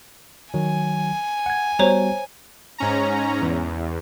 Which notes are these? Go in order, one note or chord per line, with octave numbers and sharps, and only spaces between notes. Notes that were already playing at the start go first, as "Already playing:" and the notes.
D#3 F#3 G#5
F#5 G#6
G3 B3 F#4 C5 C#5 A#5
G#2 C#4 A#5
E2